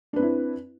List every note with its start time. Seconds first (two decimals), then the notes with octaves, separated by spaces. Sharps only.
0.13 D4
0.16 B4
0.19 C4
0.22 E4